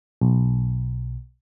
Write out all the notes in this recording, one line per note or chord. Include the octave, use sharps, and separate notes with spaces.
B1